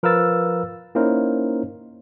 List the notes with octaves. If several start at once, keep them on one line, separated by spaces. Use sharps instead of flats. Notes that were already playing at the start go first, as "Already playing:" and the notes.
F3 A#4 B4 F5 E6 A6
A#3 C#4 D#4 E4 A#4 C5